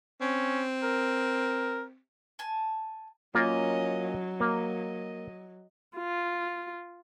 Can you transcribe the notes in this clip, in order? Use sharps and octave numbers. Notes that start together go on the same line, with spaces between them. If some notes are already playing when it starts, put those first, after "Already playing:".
C4 C#4
A#4
G#5 A5
F#3 A#3 C#4 F4 A#4 D#5
A#3 D#5
F4